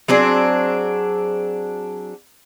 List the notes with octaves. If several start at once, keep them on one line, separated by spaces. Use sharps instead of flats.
F#3 C4 D4 G#4